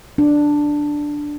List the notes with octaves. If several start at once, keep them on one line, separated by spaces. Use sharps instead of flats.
D4